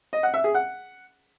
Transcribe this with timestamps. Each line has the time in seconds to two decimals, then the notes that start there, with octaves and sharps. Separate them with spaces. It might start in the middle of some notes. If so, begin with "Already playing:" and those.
0.13 D#5
0.23 F#5
0.34 E5
0.44 G#4
0.55 F#5